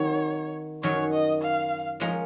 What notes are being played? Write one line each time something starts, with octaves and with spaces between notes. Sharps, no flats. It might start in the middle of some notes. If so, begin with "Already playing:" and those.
Already playing: D#3 F#3 C4 D#4 F#4 C#5
F#2 D#3 F#3 C#5
D#5
F5
F3 G#3 C#4 F4 A#4